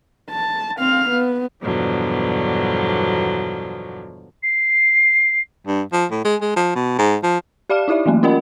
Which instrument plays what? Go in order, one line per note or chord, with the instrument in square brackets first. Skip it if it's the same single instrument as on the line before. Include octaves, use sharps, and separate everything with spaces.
[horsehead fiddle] A5
C4 F5
B3
[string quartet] E2 G2 B2 D3 F3 F#3
[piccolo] C7
[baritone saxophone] G2
F3
A2
G#3
G#3
F3
B2
G#2
F3
[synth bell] G4 D5 F5 A5 F6 E7
D#4 E4 G4 D5 E5
E3 F#3 A3 A#3
C#4 F4 A#4 D#5 F#5 B5